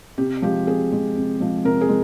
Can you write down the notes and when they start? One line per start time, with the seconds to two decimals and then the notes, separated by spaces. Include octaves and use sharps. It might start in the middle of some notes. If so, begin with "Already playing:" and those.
0.18 C3 G4
0.42 F3 G#3 G4
0.67 C3 G#4
0.92 F3 G#3
1.15 C3
1.40 F3 G#3
1.64 C3 A#4
1.81 G#4
1.89 G#3